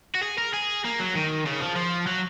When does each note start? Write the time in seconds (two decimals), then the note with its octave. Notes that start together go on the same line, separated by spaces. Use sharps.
0.15 F#4
0.23 G#4
0.38 A#4
0.54 G#4
0.85 A#3
0.99 F#3
1.15 D#3
1.46 C#3
1.60 F3
1.76 F3
2.07 F#3